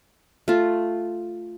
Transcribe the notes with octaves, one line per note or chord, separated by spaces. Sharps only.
A3 F4